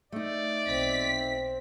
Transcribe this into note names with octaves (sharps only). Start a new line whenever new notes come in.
A3 D#4 D5
B1 C4 B6